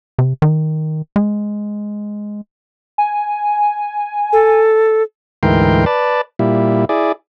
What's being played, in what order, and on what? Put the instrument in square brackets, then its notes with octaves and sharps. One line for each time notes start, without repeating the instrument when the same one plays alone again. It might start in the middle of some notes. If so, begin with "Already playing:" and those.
[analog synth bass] C3
D#3
G#3
[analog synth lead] G#5
[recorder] A4
[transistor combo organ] D2 G#2 E3 A#4 G5 C6
B4 D5 A5
A#2 G3 E4
E4 G#4 D5